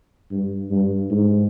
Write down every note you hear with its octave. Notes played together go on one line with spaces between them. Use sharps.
G2
G2
G#2